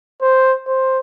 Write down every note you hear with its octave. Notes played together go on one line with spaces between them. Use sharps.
C5
C5